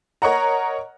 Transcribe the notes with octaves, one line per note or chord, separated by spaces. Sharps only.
A#4 C#5 D#5 F#5 A#5